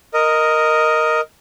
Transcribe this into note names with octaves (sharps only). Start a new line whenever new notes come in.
A#4 D#5